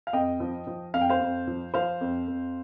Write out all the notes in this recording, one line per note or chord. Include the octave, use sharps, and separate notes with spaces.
F5
F2 D#5 G5
F3
F3
F2 F5
G5
C5 F5
F2
F3
F3 C5 F5
F2
F2